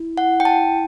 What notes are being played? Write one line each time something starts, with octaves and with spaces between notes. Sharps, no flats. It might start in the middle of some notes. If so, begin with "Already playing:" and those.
Already playing: E4
F#5
G5
A5